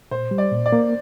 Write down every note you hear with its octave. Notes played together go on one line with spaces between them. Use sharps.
A#2 C5
G3
D5
A#2
D5
A#3